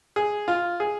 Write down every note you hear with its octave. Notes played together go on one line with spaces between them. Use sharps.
G#4
F4
G#4